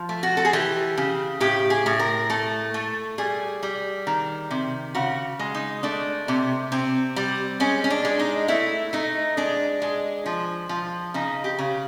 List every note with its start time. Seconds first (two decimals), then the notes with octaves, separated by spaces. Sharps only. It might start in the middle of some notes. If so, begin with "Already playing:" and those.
Already playing: F3
0.09 A3
0.23 F#4
0.37 A4
0.45 G#4
0.53 E3 G4
0.97 C#3
1.40 A2 G4
1.70 G#4
1.86 A2
2.00 A#4
2.30 A3 A4
2.74 A3
3.18 G3 G#4
3.63 G3
4.07 D#3
4.51 C3
4.95 C#3 F#4
5.39 G#3
5.55 D#4
5.83 A3 D4
6.28 C3
6.72 C3 C4
7.16 G3
7.60 G#3 C#4
7.84 C#4
7.90 D4
8.05 G#3
8.19 D#4
8.48 A3 E4
8.93 A3 D#4
9.37 G#3 D4
9.82 G#3
10.26 F3
10.69 F3
11.14 C#3 D#4
11.44 G4
11.59 C#3